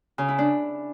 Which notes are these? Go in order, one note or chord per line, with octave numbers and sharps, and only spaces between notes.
C#3
E4
D4